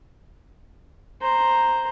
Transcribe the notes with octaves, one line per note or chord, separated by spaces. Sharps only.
C5 A#5